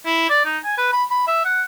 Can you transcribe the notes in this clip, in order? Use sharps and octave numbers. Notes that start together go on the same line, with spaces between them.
E4
D5
D#4
G#5
B4
B5
B5
E5
F#5